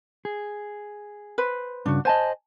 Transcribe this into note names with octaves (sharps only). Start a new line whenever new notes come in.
G#4
B4 C5
G2 C#3 D4 F#4
C5 D#5 G#5 A5